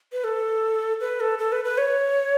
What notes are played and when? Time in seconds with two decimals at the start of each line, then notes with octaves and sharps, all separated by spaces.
0.13 B4
0.24 A4
1.00 B4
1.20 A4
1.39 A4
1.52 B4
1.64 B4
1.78 C#5